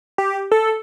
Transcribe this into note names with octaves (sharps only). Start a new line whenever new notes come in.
G4
A4